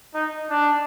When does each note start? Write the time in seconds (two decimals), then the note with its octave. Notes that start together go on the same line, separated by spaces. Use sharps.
0.14 D#4
0.50 D4